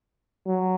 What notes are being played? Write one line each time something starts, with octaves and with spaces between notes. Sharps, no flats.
F#3